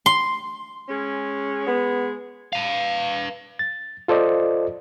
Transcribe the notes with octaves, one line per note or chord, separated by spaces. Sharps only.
C6
G#3 C#4
G#3 B3
B4 F5
A6
F4 A4 C5 D5 D#5